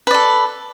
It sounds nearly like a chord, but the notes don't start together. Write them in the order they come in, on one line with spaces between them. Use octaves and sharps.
B4 D5 A4